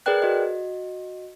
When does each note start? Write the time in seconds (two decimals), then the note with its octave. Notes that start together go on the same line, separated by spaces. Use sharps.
0.06 G#4 A#4 B4 D5 G5 F#6
0.22 F#4 D#5